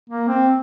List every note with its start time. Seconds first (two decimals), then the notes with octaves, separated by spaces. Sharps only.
0.10 A#3
0.28 C4